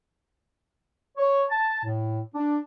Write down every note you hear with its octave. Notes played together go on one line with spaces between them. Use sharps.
C#5
A5
A2
D4